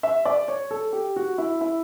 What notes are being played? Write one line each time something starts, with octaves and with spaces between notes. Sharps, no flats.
E5
D5
C#5
A4
G4
F#4
E4
E4